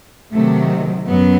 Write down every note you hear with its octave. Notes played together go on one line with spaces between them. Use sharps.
C3 D#3 F#3 A3
F#2 F#3 B3